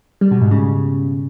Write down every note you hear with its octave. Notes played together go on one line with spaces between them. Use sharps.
G3
B2
G#2
C#3